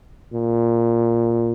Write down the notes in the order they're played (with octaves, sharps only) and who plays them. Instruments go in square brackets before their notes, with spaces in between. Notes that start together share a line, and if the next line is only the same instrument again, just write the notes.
[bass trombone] A#2